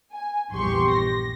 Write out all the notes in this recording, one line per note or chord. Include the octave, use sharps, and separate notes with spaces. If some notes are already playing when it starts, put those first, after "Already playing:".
G#5
A#1 E2 G2 G4 C6 C#6
A#6